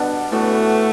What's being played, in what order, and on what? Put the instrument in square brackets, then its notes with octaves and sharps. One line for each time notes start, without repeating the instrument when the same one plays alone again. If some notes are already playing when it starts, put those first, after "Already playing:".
Already playing: [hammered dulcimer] B2 G3 B3 D4 A4
[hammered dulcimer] A2 E3 B3 F#4 [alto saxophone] A3